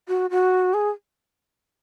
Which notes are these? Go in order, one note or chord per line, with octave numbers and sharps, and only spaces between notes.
F#4
F#4
G#4